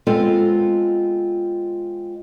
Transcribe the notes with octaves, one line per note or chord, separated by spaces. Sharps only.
G#3 B3 C4 F4 A4